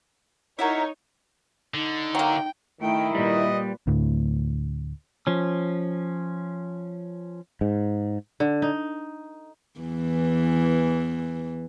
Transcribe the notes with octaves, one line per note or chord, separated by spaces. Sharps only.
D#4 E4 F#4 A#4 C#5
D3 D#4
F#3 A#3 G5
D#3 A3 E4 G5
A#2 G3 B4 D#5
D2 A2
F3 C#4
G#2
D3
D#4
E2 E3